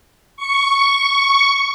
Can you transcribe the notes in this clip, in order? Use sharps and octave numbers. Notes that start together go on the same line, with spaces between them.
C#6